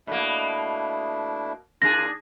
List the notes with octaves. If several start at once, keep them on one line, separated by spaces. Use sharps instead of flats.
B2 A3 A#3 D4 E4
D#2 D4 F4 G#4 A#4 A#6